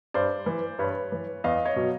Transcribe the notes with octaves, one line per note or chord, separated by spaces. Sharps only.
G2 C5 D5
E3
G2 B4 C#5
E3
E2 D#5 F5
C#5 D#5
B2 F#3